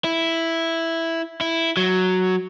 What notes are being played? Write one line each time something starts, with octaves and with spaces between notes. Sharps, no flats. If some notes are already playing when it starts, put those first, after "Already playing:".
E4
E4
F#3